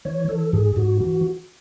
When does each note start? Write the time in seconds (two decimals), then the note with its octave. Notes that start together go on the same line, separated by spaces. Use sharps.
0.05 E3 C#5
0.28 E3 A4
0.53 G#2 G#4
0.76 G#2 F#4
1.00 E3 F#4